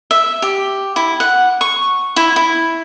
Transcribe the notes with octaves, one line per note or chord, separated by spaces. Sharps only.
E5
G4
E4
F#5
C#6
E4
E4